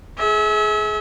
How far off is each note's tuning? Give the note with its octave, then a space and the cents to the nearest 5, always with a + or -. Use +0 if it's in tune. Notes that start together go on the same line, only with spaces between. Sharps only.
G#4 +25 E5 -30